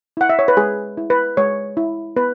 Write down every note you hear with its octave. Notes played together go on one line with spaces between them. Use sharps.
E4 F#5
E5
C#5
B4
G#3 G#4
E4
B4
G#3 C#5
E4
B3 B4